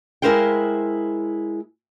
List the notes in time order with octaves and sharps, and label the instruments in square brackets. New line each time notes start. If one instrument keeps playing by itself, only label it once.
[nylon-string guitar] G#3 E4 A#4 C5 F5 G5